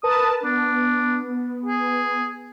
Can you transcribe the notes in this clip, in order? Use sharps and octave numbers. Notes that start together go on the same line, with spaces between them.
A#4 B4 A5 D#6
B3 D4
G#4